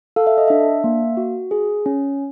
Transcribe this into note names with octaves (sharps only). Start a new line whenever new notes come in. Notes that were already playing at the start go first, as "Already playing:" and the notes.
A4 F5
E5
D#5
D4 E5
A#3
F#4
G#4
C#4